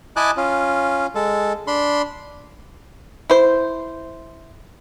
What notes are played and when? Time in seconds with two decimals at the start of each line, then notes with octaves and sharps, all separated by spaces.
0.16 E4 D#5 G#5 A5 D6 F#6
0.37 C#4 F4
1.15 G#3 A4
1.67 D4 B5 C6
3.30 E4 C5